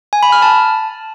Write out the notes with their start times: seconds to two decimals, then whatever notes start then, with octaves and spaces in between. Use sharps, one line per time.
0.13 G#5
0.23 B5
0.32 F6
0.42 A5